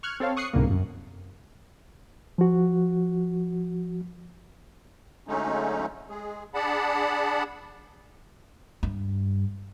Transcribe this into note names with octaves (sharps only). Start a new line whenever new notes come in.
C#6 F6 F#6 G#6
C4 A4 C#5 F5
C#6 D#6 F#6 C7 C#7
C2 G#2 B2 D3 G3 A#3
F#2
F3 F#4
D3 F#3 G#3 A3 C#4 D#4
G#3 G#4
D4 G#4 D5 F#5 A5 B5
G2